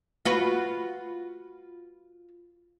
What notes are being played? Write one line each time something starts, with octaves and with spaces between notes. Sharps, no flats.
F4 F#4 B4